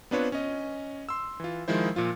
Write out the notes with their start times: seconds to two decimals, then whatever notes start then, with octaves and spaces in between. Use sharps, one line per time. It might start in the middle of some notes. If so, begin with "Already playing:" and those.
0.11 B3 C4 D4 F4 B4 C#5
0.32 C#4 D#5
1.09 C6 E6
1.40 E3 F4
1.68 D#3 F3 G#3 E4 C5
1.96 A#2 F3 F4